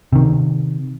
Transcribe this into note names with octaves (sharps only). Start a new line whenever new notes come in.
C3 D#3